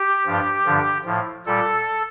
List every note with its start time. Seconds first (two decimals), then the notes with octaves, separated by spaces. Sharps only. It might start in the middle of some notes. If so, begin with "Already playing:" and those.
Already playing: G4
0.26 G2 F3
0.65 G2 D3 F3
1.05 A2 F3
1.46 A#2 G3 A4